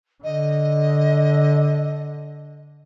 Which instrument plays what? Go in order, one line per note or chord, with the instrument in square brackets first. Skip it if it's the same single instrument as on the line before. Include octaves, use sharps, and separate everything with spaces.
[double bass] D3 [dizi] D#5